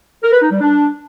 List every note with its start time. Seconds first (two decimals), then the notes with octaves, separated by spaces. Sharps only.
0.23 A#4
0.32 B4
0.42 D#4
0.51 G3
0.60 D4